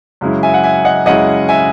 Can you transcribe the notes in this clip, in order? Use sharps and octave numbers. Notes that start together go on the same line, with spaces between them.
F#2 C#3 G#3 C#4 E4
E5 G#5
F#5
E5 G#5
D#5 F#5
F#2 C#3 G#3 C#4 E4 D#5 F#5
E5 G#5